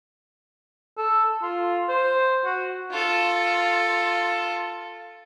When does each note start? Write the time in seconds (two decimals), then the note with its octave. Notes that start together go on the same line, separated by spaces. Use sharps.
0.97 A4
1.42 F4
1.89 C5
2.45 F#4
2.91 F4 A4